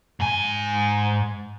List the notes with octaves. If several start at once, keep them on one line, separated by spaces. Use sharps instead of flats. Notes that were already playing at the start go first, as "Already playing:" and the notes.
G#2 G#5